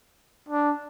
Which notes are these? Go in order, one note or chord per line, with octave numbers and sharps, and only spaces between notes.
D4